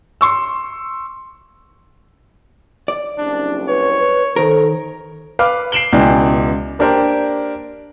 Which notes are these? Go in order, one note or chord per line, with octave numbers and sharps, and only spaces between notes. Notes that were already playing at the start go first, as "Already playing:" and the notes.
C6 C#6 E6
D5
F#1 C2 D4
B4 C#5
B4
D#3 A4 A#4 C5
B4 F5 D6 F6
C7 D7 E7 F#7 G7
C#2 B2 E4 D5 G5 G#5
A#3 D4 G4 A#4 C5 D5